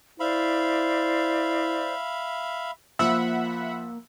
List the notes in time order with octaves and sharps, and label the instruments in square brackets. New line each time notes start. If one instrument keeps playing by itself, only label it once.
[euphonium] E4 [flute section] C5 D5 [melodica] E5 F5 B5
[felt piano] F3 [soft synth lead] A#3 [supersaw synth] E5 F#5 B5 [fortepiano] E6